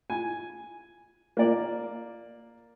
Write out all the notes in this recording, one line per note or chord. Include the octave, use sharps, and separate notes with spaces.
G#5
A#3 D5